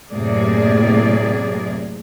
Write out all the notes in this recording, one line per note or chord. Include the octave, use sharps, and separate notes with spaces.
F#2 A2 C3 A#3 G#4 D5